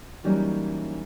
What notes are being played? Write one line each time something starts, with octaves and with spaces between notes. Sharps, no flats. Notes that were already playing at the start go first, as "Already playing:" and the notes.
E3 F#3 G3 A#3 C#4 D#4